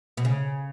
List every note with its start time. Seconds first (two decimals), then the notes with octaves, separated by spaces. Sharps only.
0.17 B2
0.25 C#3